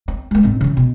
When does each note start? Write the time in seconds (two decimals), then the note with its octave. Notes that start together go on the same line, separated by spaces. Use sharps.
0.08 C4
0.31 G#3 A#3
0.43 A2 C4
0.61 C#3 E3
0.77 B2